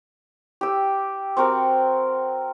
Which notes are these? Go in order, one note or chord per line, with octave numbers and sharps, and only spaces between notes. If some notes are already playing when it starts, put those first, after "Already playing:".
G4 E6
C4 F#4 A#4